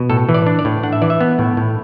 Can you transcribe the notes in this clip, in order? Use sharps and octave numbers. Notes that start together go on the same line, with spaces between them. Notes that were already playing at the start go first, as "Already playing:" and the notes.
Already playing: B2
A2 A4
E3
D5
D4
D5
A2
D4 F#5
E5
E3 D5
E5
B3
A2
A2